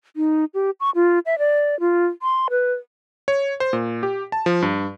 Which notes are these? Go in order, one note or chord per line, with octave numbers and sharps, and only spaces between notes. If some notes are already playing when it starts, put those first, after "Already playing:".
D#4
G4
C#6
F4
E5
D5
F4
C6
B4
C#5
C5
A#2
G4
A5
F3
G2